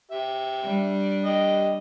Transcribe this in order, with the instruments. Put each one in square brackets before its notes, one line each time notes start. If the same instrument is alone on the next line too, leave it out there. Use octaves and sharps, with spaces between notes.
[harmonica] G4 E5
[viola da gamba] G3 D4
[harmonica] G4 D#5